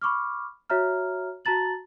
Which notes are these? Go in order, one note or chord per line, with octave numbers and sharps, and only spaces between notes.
B5 C#6 D6 F6
F#4 C#5 E5 A#5 F6
F#4 A5 A#5 A6 F#7